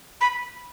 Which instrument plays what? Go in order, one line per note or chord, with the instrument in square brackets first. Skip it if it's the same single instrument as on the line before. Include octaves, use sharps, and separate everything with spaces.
[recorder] B5